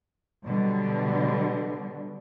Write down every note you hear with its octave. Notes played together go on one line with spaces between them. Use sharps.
B2 D3 F#3 G3